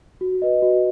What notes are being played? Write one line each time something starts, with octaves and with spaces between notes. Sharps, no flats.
F#4
B4 D#5
F#4